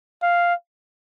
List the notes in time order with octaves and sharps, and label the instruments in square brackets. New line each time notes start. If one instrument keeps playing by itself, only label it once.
[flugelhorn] F5